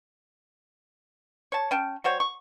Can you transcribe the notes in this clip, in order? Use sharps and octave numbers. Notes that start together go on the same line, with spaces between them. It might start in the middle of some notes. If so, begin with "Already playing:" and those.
C#5 A5
C#4 G5 A5
G3 F#4 C5 C#5
C#6